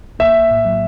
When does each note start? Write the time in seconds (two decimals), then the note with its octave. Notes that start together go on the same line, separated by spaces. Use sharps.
0.19 A#3 E5
0.35 A#1
0.51 A2
0.65 F#3